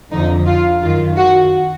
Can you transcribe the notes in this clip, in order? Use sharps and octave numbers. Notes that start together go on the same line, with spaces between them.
F2 D3 F3 D#4
F4
F#2 D#3 F4
F#4